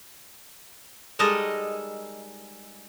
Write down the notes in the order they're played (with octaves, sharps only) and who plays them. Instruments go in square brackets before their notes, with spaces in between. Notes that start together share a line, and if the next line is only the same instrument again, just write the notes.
[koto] G3 G#3 D#4 A4 A#4 D#5